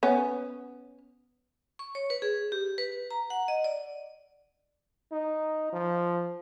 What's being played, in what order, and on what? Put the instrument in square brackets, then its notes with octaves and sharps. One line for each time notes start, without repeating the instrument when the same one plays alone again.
[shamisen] B3 C#4
[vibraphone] C#6
C#5
B4
G#4
G4
B4
A#5
F#5
D#5
D5
[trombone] D#4
F3